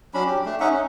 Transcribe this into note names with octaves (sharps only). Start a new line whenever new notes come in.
F#3 C#4 D4 B5
G4
A3 D4
C#4 D#4 E5 F#5
C#4